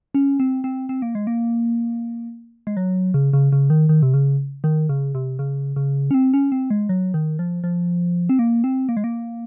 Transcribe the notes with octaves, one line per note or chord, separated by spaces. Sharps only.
C#4
C4
C4
C4
A#3
G#3
A#3
G#3
F#3
C#3
C#3
C#3
D#3
D#3
C3
C#3
D#3
C#3
C3
C#3
C#3
C#4
C4
C#4
C4
G#3
F#3
D#3
F3
F3
C4
A#3
C4
A#3
G#3
A#3